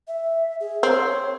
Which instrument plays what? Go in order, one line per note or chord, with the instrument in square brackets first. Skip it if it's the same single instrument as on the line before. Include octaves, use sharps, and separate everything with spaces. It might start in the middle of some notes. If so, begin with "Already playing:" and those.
[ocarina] E5
G#4
[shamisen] C4 [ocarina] C#5